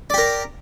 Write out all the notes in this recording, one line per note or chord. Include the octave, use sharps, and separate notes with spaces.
G4 A#4 D5